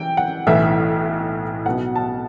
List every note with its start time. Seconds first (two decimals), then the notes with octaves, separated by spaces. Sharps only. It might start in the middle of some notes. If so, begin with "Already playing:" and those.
Already playing: E3 G5
0.17 F#5
0.47 B1 A2 E3 E5
1.65 B1 B2 F#5
1.96 A5